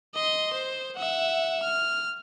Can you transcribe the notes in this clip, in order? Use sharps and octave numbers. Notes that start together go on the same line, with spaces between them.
D#5 C6
C5
E5 F#5
F6